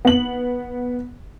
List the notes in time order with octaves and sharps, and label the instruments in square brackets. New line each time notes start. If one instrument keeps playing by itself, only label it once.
[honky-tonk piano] B3 F#7